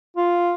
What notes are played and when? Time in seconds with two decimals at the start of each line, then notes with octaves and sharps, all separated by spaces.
0.16 F4